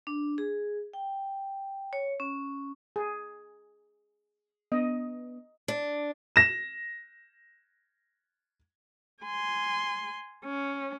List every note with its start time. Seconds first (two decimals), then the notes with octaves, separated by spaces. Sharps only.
0.07 D4
0.38 G#4
0.94 G5
1.93 C#5
2.20 C#4
2.96 G#4
4.72 B3 D4 D#5
5.68 D4
6.36 A#6 E7
9.23 G#5 C6
10.44 C#4